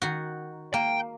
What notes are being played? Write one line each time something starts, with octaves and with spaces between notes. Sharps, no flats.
D#3 F#4
A#3 G5